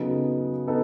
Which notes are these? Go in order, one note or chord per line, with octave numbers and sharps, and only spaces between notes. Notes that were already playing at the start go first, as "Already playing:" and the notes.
Already playing: C#3 F#3 B3 D#4 A4
B3 D#4 A4